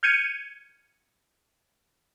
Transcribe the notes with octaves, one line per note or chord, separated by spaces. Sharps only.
F6 G6 G#6 C#7 D#7